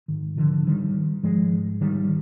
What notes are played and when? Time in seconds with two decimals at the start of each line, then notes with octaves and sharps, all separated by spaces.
0.08 G#2 D#3
0.37 D3 F3
0.67 D#3 G3
1.23 G#2 F3 G#3
1.81 D#3 G3